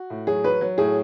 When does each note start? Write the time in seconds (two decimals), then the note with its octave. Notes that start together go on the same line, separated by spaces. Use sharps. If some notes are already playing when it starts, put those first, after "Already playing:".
Already playing: F#4
0.10 A2
0.27 F#3 G#4
0.44 F#3 B4
0.61 F#3
0.78 A2 G#4